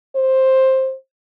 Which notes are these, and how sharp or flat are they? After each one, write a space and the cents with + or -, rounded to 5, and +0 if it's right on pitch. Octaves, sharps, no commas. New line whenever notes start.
C5 +10